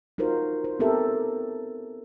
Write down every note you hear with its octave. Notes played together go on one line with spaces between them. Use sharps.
D#4 F4 F#4 A#4 C5
C5
B3 C4 G4 A4 A#4 E5